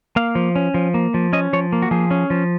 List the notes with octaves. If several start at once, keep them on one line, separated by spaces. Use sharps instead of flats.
A#3 F5
F3
C#4
F3
A#3
F3
C#4 D#5
F3 C#5
A#3
F#4
F3 G#4
C#4
F3